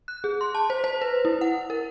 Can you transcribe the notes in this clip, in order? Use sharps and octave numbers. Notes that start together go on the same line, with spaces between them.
F#6
G#4
C6
A5
C5
C5
B4
E4
F#5
A#4